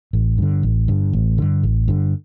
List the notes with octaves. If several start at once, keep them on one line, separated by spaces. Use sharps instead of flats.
A1
G2 D3
A1
G2 D3
A1
G2 D3
A1
G2 D3